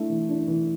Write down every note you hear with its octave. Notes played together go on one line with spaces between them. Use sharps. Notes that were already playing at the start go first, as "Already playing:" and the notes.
Already playing: A3 D4 E4
E3
D4
E3